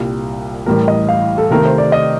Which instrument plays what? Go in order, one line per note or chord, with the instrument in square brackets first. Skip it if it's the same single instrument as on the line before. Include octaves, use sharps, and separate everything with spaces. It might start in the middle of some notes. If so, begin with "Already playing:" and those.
Already playing: [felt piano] C2 A#2 G3
[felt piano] A1 A2 G3 [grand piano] A#4
[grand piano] D#5
F5
A4
[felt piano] C3 D#3 A3 [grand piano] A#4
[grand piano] C5
D5
D#5